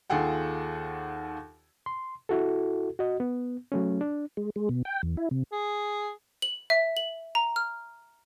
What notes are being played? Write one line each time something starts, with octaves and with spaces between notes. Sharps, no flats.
D#2 F4 G#4 A4 F#5 G5
C6
E4 F#4 A4
F#4 D#5
B3
F#3 A3 C#4
D4
G#3
G#3
B2
G5
E2
E4
C3
G#4
F#7
E5
F#7
A#5
F6